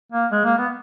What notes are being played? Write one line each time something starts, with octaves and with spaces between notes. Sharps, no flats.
A#3
G#3
A#3
B3